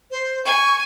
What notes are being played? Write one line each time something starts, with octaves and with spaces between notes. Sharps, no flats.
C5
G#5 C#6